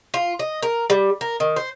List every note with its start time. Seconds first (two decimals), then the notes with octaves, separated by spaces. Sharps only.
0.14 F4
0.39 D#5
0.63 A#4
0.90 G3
1.21 A#4
1.40 D#3
1.56 C5